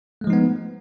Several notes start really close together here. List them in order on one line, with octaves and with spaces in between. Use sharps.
A3 G#3 F3 D#4 B3